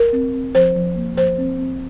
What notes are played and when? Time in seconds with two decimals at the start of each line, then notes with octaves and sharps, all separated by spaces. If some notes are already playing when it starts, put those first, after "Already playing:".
Already playing: A#4
0.13 C4
0.34 C4
0.55 F3 C5
0.76 F3
0.96 A#3
1.16 F3 C5
1.38 C4
1.58 C4